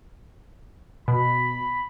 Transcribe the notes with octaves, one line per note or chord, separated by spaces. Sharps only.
B2 B5